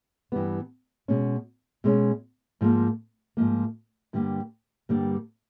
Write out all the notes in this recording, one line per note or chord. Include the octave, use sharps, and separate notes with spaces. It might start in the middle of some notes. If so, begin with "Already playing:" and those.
G2 E3 G3 B3
B2 G#3 C#4
B2 G#3 C#4
G#2 F3 A#3
G#2 F3 A#3
G2 D3 G3 A#3
G2 D3 G3 A#3